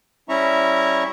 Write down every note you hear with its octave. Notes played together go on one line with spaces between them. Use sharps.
G3 C#4 E4 E5 A#5 C#6